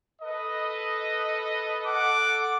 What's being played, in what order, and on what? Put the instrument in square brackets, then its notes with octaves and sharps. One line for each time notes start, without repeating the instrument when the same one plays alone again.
[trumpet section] A4 B4 D#5
[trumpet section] A4 F#5 [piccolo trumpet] D6